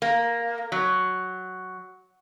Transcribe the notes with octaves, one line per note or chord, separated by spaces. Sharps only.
A#3
F#3